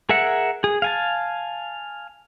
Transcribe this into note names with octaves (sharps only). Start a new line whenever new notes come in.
G#4 A#4 E5 F#5
G#4
F5 G#5 A5